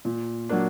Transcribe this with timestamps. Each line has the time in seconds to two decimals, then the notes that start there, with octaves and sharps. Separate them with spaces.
0.05 A#2
0.49 F#3 A#3 D4